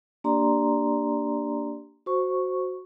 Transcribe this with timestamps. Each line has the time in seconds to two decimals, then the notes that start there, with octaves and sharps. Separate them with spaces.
0.24 A#3 D4 G4 D5 A#5 C6
2.06 F#4 C5 C#6